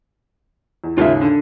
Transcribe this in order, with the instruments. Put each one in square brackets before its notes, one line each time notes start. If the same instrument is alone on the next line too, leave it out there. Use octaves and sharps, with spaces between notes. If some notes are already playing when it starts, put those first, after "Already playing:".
[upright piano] E2
[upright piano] D#2 G#2 C#3 [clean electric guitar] F4 A#4 E5
[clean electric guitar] D3